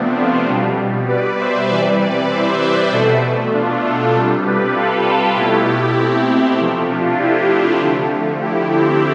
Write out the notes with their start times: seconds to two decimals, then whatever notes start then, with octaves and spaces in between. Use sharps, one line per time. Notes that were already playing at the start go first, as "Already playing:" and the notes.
Already playing: C3 F3 A3 B3 C4 D4
0.17 D4 F4
0.48 B2 G3
1.08 B4 D5
1.39 C5 E5
1.70 C3 E3 G3 B4 D5
2.00 B4 D5
2.30 C5 E5
2.61 B4 D5
2.92 B2 A3 A4 C5
3.53 D4 F4
3.84 F4 A4
4.14 C3 G3
4.45 G4 B4
4.75 F4 A4
5.06 F4 A4
5.37 B2 A3 E4 G4
5.98 C4 E4
6.58 C3 F3 A3
6.89 D4 F4
7.19 E4 G4
7.80 D3 F3 A3
8.41 E4 G4
8.72 C4 E4